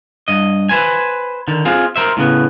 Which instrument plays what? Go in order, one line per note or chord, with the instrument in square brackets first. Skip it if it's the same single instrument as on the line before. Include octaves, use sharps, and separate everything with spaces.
[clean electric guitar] G2 D#5
B4 C5 G#5
D3 D#3
C4 F4 G#4
A#4 C5 E5
A2 C#3 B3